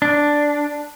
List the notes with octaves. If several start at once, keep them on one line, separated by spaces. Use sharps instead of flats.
D4